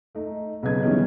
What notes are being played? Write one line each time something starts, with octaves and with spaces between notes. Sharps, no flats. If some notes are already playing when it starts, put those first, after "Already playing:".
A3 D#4
B1 C#3 F#3 B4 D#5 G#6
D#3 E3 G3 G#3 B3 C#4